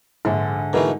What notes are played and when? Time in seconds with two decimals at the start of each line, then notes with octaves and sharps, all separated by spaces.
0.25 A#1 G#2 D3
0.73 B2 E3 A3 D#4 G#4 A#4